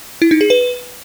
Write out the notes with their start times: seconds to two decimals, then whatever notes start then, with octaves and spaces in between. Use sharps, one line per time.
0.22 E4
0.31 D#4
0.41 G#4
0.50 B4